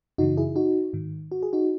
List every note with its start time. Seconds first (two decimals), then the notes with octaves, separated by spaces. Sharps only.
0.18 F#2 C#3 E3 D#4 F#4
0.37 E4 G#4
0.56 D#4 F#4
0.93 G#2 D#3
1.32 F#4
1.43 G#4
1.53 D#4 F#4